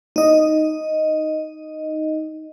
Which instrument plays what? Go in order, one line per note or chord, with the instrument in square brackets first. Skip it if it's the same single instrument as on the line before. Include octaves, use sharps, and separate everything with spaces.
[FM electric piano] D#4 D#5